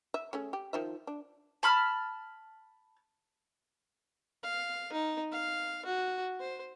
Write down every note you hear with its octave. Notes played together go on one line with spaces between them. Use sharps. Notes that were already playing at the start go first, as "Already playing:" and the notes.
E5
A3 C#4 G#4
G4
D#3 F3 E5
D4
A5 B5 F6
F5
D#4
F5
F#4
C5